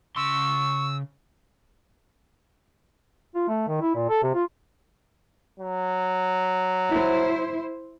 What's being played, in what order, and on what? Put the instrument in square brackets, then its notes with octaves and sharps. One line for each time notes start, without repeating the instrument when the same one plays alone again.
[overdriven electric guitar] C#3 C6 [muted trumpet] C#6 [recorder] E6
[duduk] F4
A3
D#3
E4
A#2
A4
C3
F4
[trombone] F#3
[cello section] E4 C5